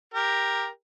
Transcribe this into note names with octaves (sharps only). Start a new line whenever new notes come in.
G4 A#4